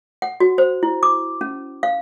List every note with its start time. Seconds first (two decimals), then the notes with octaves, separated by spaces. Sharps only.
0.22 F#5
0.40 F#4
0.58 C5
0.83 E4
1.03 D6
1.41 C#4
1.83 F5